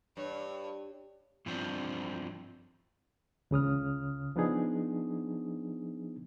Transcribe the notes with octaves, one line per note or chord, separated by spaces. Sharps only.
G2 C#5
G2 F3 C4 D4
C#2 C#3 D#6 F6
F3 B3 D4 D#4 G#4